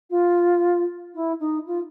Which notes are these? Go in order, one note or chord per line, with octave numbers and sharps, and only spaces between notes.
F4
E4
D#4
F4